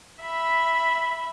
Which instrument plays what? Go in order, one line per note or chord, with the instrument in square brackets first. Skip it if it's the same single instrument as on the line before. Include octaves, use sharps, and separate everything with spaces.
[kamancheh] E5 B5